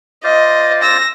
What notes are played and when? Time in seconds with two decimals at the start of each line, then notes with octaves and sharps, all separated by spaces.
0.24 F4 C5 D5 D#5
0.82 E6 A#6